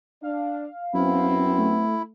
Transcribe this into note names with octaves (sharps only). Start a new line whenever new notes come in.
D4 F5
F#2 B3 C4 E4
A3